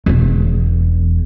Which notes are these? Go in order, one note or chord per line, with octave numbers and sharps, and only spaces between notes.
E1 E2